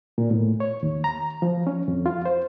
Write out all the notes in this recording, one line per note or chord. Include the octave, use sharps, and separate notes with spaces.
A#2
A2
C#5
D#2
A#5
F3
C#4
F2
F4
C5